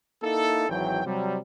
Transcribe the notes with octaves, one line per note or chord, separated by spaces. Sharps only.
A#3 D#4 E4 A4
G#1 E3 F#3 G5
C3 F#3 G3